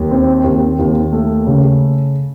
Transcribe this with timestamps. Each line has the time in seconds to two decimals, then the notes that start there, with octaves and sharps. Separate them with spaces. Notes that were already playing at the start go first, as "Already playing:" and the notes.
Already playing: D#2
0.11 C4
0.44 D#2
0.79 D#2
1.12 A3
1.47 C#3